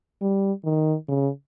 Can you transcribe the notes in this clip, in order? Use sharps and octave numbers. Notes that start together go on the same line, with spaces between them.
G3
D#3
C#3